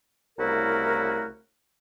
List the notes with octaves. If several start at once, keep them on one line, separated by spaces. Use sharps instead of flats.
C2 C#3 A3 E4 F#4 A#4